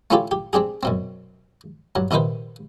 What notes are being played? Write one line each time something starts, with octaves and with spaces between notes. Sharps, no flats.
A3 C#4 E4 F4 G4 A4
G4
C4 D4 G4 G#4
F#2 B2 C4
G2 F#3
A#1 C3 D#3 D#4 B4 C5